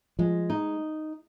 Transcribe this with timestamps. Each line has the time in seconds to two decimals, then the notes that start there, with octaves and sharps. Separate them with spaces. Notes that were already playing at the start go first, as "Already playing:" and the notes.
0.19 F3 G#3
0.50 D#4